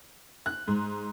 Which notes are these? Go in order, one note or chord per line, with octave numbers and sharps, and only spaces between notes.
F#6
G#2